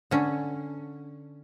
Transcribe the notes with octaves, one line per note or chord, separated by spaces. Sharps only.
D3 C#4